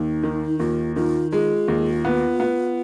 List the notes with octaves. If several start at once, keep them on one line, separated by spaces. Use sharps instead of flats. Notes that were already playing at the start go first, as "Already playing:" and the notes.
Already playing: D#2 D#4
D#3
D#2 F4
D#3 F4
G#3 F4
D#2
B3
B3